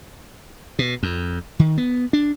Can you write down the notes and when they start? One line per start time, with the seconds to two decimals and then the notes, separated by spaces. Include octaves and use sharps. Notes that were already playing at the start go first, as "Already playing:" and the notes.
0.79 B2
1.03 F2
1.59 D#3
1.78 B3
2.13 D4